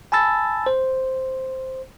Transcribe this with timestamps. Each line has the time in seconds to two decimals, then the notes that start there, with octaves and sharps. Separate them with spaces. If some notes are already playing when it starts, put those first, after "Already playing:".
0.12 G#5 A5 B5 E6 A6
0.66 C5